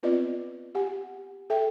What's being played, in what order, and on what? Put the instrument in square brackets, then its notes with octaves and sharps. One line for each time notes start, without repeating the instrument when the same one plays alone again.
[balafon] B3 C4 F4 B4 D5 D#5
G4 F#5 G#5
A4 E5 G5